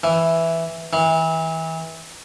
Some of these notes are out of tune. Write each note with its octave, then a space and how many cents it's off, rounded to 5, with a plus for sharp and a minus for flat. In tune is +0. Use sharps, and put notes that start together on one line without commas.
E3 +0
E3 -30